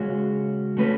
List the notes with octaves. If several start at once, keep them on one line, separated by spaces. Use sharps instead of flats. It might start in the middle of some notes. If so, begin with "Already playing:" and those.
Already playing: C#3 G#3 C#4 F#4
A3 C#4 F#4 B4